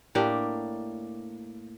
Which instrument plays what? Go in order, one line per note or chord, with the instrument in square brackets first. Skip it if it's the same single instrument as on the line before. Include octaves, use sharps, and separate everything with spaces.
[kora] A2 A#3 D4 G4